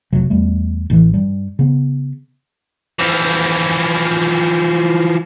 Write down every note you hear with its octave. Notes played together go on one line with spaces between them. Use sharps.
F1 B1 C3 F#3
E2 G3 A3
A1 A2 E3
G2 G3
C#3 B3
E3 F3